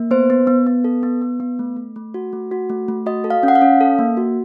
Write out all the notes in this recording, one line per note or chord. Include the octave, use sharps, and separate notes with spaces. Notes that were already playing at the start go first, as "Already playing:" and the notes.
Already playing: A#3
B3 C5
B3
B3
B3
A4
B3
B3
B3
A3
A3
A3
F#4
A3
F#4
A3
A3
F#4 D#5
A4
F5
C#4
F#5
F5
C#4
A4
A#3
F#4